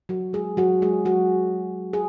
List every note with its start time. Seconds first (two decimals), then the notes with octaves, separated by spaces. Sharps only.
0.09 F#3 F#4
0.33 G#3 G#4
0.57 F#3 F#4
0.82 G#3 G#4
1.05 F#3 F#4
1.93 G#4